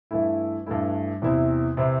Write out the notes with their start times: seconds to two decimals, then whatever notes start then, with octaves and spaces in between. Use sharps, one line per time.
0.11 G2 E3 A3 E4
0.66 G2 E3 A3 E4
1.22 E2 C3 E3 C4 E4
1.77 C3 E3 C4 E4